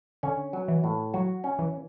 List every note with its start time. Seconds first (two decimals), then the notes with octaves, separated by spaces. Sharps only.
0.23 D3 C#4
0.53 F#3
0.68 E3
0.84 A2
1.14 F#3 F#4
1.44 C#4
1.59 E3